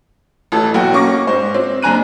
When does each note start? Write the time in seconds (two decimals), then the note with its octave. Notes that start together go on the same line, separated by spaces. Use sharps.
0.52 A1 E3 A4
0.74 B1 F#4 G5
0.92 A#3 C#4 C#6 D6 A#6
1.27 G#2 C5
1.54 C4
1.82 F#1 D4 G#5 A#5 F#6 D#7